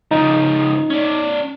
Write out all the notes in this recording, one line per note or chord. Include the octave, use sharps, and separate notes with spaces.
C#3 F3 D#4
C#4 D5